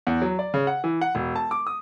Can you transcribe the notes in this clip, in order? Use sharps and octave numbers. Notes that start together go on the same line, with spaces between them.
E2
F#3
D5
C#3
F#5
E3
F#5
E1
A5
D6
D#6